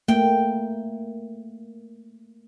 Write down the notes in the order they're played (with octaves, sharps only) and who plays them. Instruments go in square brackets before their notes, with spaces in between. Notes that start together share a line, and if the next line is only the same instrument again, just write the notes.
[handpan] A3 A#3 [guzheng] G5